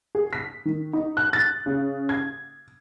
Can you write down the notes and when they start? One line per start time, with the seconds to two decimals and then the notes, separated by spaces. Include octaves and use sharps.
0.15 G#4
0.33 B6
0.65 D#3
0.93 D#4
1.17 F#6
1.33 A6
1.66 C#3
2.09 G#6